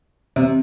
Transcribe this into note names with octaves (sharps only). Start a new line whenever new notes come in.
C3